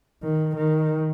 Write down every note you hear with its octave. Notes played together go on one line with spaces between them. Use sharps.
D#3
D#3